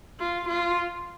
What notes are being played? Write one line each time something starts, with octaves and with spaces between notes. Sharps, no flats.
F4
F4